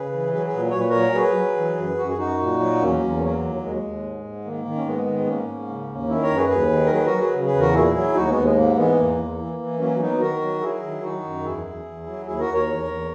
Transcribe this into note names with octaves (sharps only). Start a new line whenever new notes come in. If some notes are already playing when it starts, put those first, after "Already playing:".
Already playing: C#3 G#4 B4
E3
F#3 G#4 B4
G#4 B4
A#2
A#2 C#5
B4
A#4 C#5
F#3
F#3 G#4 B4
F#3
E3
F#2
F#2 F#4
G#4
F#2 D#4 F#4
A#2
F#3
E2 A#3 C#4
E2
F#3 A#3
D#2
D#2 G#3
D#2
G#2
G#2
D#3 A#3
D#3
C#4
G#2 G#3 B3
D#3
G#2 A#3 C#4
G#2
C#3
D#2
D#3 C#4 E4
A#4 C#5
F#2
G#4 B4
D#2 G#4 B4
D#3
A#4
F#3 G#4 B4
F#4 A#4
F#3
G#4 B4
C#3
G#4 B4
E2
F#4 A#4
A#2 E4 G#4
F#3
D#2 D#4 F#4
G#3 B3
D#2
G#3
G#2 A#3
E3 G#3 B3
E2 A#3
E2
E3
E3
F#3 A#3 C#4
F#3 B3 D#4
D#3 F#4 A#4
F#3
F#3 E4 G#4
D#3
D#3 D#4 F#4
F#2
E2 E4 G#4
E2
E2
F#3
D#2 E4 G#4
F#4 A#4
D#2
A#4 C#5
E2
E2